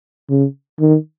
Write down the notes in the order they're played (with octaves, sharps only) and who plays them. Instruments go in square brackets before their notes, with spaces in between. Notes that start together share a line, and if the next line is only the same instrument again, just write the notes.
[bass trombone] C#3
D#3